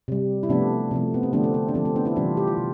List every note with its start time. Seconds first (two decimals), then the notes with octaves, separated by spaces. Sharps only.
0.08 C3 G3
0.43 E4
0.49 C3 F3 A3 B3 D4
0.91 C3 F3 A3
1.14 B3
1.23 C4
1.33 D3 F3 A3 B3 D4
1.44 C4
1.54 C4
1.68 D4
1.74 D3 F3 A3 C4
1.85 C4
1.96 B3 D4
2.05 C4 E4
2.16 C3 E3 G3 D4 F4
2.37 G4
2.47 F4
2.57 C3